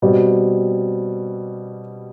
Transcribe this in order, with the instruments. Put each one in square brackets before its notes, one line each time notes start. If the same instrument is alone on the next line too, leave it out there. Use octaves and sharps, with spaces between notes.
[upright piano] B2 G3 C4